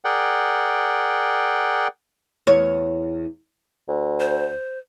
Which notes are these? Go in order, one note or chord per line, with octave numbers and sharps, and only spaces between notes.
G#4 A#4 D5 F#5 G5
E2 C#5
D2
C5